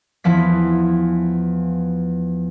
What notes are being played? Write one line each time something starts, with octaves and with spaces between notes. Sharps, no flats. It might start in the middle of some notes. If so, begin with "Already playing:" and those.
E2 E3 F3 B3 B6